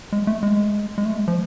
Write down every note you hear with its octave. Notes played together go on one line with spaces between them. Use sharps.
G#3
A3
G#3
G#3
A3
G#3
F3